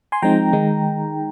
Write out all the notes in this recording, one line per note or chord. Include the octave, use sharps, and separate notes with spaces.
G#5 C6
F3 G#3 C4 D#4 G5 A#5
D#3 G#3 D#4